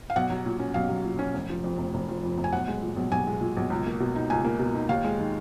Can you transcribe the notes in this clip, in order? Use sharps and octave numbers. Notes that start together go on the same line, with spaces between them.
F5
B1 F#5
F#3
A#2
C#4
B1 F5
F#3
A#2
C#4
F1
F3
F2
F1
F1
F3
F2
F1
G#5
B1 F#5
G#3
A#2
B1
B1 G#5
G#3
A#2
B1
C#2
A#3
B2
D#4
C#2 G#5
A#3
B2
D#4
D#2 F5
G#3
D#3